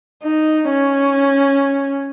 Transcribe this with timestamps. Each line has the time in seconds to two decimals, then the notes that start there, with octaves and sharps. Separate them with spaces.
0.23 D#4
0.69 C#4